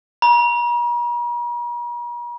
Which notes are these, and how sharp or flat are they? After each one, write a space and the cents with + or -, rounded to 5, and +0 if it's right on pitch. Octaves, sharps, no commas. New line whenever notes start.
A#5 +45